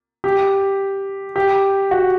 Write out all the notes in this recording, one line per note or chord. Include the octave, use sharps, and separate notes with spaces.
G4
G4
F#4